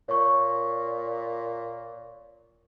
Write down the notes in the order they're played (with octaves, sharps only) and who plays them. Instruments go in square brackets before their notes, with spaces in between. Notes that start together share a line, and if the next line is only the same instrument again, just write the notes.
[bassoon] A#2 [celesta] C#5 C#6